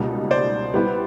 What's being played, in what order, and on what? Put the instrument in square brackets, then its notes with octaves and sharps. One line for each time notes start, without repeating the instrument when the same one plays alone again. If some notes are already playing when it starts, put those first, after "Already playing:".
Already playing: [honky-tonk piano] C#2 B2 G3 A#3 D#4
[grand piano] C5 D5
[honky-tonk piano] G3 B3 E4 G4 B4